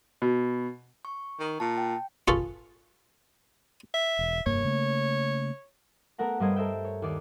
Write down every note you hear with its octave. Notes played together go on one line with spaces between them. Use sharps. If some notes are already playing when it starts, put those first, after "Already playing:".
B2
C#6
D#3
A#2 A5
G5
F4 G#4 A4 B4 F5 C#6
E5
E1
F1 G2 A#3 C#5
C#3 A3 A#3
A3 B3 A#4 F#5 A#5
G2 G3 A#4 C5 D#5 G#6
A4 A#4 C5 E5 G5
C#5
D#2 D5 C#7